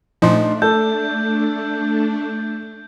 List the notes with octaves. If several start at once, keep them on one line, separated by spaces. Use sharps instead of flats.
A#2 F3 A3 D4 D#4 C6
A4 G6